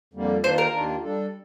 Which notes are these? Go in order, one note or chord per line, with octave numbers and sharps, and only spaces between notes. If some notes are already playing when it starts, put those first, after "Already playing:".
F2 D3 G3 A#3
D#2 D#3 A#3 D4 F4 C5
A#4
D#2 D#3 A#3 D4 F4
G3 D4 A4